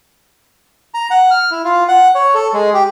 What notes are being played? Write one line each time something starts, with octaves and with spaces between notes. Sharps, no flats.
A#5
F#5
F6
E4
F4
F#5
C#5
A4
G#3
G4